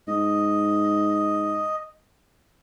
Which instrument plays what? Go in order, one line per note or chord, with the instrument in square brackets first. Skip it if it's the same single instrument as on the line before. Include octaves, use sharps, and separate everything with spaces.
[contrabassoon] G#2 [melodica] D#5